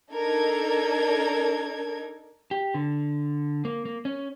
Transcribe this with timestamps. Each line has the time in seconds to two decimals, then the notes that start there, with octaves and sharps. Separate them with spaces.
0.13 D4 D#4 A4 A#4 G#6
2.51 G4
2.74 D3
3.65 A#3
3.85 A#3
4.05 C#4